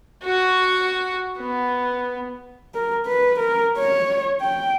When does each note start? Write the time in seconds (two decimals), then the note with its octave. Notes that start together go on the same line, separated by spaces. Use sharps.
0.23 F#4 C#6
1.39 B3
2.75 A#4
3.06 B4
3.39 A#4
3.77 C#5
4.41 G5